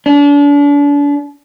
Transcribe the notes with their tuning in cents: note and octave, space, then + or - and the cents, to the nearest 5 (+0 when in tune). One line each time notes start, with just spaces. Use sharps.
D4 -35